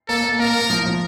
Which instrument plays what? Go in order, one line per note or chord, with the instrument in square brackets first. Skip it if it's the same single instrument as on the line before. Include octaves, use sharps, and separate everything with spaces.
[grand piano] A#3 [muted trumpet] A4
[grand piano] A#3
[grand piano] A#3 [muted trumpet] A#4
[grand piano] A#3
F3
F3